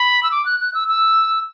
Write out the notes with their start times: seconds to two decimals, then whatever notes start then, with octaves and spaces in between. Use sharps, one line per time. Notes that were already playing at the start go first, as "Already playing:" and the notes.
Already playing: B5
0.23 E6
0.31 D6
0.46 F#6
0.60 F#6
0.74 E6
0.88 E6